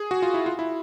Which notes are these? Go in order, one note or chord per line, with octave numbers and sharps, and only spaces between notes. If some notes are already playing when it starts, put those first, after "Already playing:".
Already playing: G#4
F#4
F4
E4
F4
E4